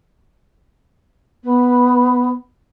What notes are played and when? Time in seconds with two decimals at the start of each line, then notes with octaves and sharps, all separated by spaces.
1.44 B3